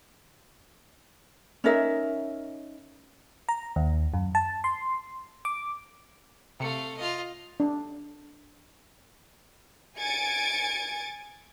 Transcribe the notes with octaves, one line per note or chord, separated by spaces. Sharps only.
C#4 D#4 A#4 E5
A#5
D#2
F#2
A5
C6
D6
C3 A3 F5 C#7
F4 D#5
D4
G#5 G#6 A6 C#7 D7